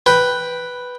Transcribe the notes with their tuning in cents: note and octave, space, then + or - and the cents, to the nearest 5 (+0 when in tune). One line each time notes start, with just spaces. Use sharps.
B4 +0 G5 +0